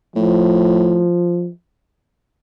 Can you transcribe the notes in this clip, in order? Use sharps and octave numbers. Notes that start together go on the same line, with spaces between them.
A2 F3